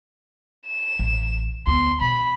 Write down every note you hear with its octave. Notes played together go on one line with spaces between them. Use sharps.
E7
A1
D2 B3 C6
B2 B5